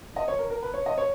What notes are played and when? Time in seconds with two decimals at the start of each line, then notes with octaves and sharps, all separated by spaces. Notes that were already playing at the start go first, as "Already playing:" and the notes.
0.16 D#5
0.28 C#5
0.39 A#4
0.50 A#4
0.62 B4
0.74 C#5
0.86 D#5
0.98 C#5